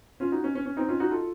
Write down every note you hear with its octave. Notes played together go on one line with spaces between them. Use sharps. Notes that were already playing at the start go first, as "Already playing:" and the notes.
C#4 F4
D#4 F#4
C#4
C#4
C#4
C4 D#4
C#4 F4
D#4 F#4
F4 A4